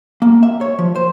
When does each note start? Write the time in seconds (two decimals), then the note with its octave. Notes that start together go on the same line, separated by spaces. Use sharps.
0.22 A#3
0.43 E5
0.61 C#5
0.79 F3
0.96 C5